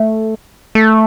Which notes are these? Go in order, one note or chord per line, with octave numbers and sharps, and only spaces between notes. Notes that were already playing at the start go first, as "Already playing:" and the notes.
Already playing: A3
A3